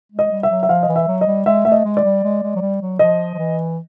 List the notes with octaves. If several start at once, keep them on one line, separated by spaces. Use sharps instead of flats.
G#3
D#5
G3
E5
F#3
E5
F3 F5
D#5
E3
E5
F#3
D#5
G3
G#3 E5
A3 E5
D#5
G#3
D5
G3
G#3
G#3
F#3
G3
F#3
F3 D#5
F3
E3